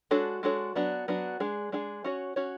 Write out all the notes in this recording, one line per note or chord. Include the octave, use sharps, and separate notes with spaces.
G#3 D4 F#4 A4 C#5
G#3 D4 F#4 A4 C#5
F#3 B3 D4 F#4
F#3 B3 D4 F#4
G#3 D4 G#4
G#3 D4 G#4
C#4 F#4 C#5
C#4 F#4 C#5